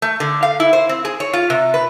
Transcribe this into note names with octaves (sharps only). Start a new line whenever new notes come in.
A3
D3
F5
E4
C5
C4
G#4
C#5
F4
C3
B4